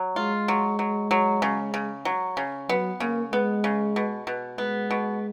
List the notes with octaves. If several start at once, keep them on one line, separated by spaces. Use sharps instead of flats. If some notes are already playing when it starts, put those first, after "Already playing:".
Already playing: F#3
G#3 F4
F#3
F#3
F#3
C#3
C#3
F#3
C#3
F#3 B3
C#3 A#3
G#3 B3
C#3
B2
B2
G#3 B3
B2